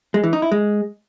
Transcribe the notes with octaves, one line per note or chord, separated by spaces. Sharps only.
G#3
E3
D#4
E4
G#3